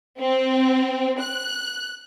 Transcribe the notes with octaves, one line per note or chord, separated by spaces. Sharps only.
C4
F#6